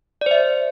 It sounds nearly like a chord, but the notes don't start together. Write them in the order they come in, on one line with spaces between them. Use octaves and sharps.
D5 C5 E5